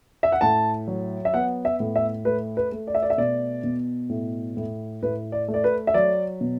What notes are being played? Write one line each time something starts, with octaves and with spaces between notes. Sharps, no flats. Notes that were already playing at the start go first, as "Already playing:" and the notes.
E5
F#5
A2 A5
F#3
E5
B3 F#5
E5
A2
E5
A3 B4
B4
A3
D5
E5
D5
E5
B2 D5
B2
A2
A2
A2 B4
D5
A3
D5
B4
E5
F#3 D5
B2